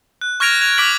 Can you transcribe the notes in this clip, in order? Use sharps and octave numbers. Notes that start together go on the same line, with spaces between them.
F#6
C#6 F6 G#6 A#6 D7 F7
G#6 F7
D6 F6 B6 D7 F#7